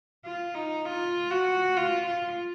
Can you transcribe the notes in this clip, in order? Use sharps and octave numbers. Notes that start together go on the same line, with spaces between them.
F4
D#4
F4
F#4
F4
F4